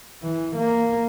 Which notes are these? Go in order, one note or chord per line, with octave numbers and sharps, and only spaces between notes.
E3
A#3